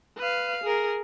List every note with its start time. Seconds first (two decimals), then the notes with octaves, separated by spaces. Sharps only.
0.18 B4 F5
0.64 G#4 A#4